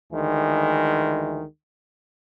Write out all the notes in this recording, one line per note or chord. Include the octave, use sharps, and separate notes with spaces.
D2 D#3 E3 G#3